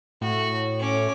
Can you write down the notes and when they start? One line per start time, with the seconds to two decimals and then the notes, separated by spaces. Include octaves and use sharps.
0.21 A2 F#4
0.79 C#4 D6